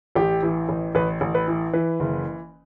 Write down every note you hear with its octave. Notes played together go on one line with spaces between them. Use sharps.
A1 G4
E3
A1
A1 B4
A1
B4
E3
E3 B4
F#1